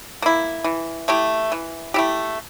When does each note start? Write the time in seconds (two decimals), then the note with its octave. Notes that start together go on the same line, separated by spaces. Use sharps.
0.22 A#3 E4
0.64 E3
1.08 A3 E4 G4
1.52 E3
1.94 A3 E4 G4